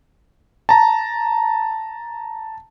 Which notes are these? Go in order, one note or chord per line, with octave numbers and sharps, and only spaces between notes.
A5 A#5